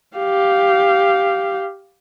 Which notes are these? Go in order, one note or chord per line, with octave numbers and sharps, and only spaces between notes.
G4 F5